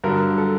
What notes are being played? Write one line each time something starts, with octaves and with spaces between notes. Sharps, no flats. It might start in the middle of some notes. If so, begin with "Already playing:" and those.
G2 D3 F#3 A#4
A4